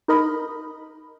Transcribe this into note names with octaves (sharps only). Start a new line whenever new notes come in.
D#4 A#4 D#5 B5